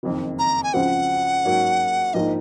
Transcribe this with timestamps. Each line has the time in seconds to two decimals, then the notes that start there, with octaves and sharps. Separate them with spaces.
0.03 F#1 F2 D#3
0.39 A#5
0.64 G#5
0.74 C#2 C#3 F3 C4 F#5
1.44 G#2 F#3 A#3 C#4
2.14 A#1 G#2 F3 A#3 D#4 D#5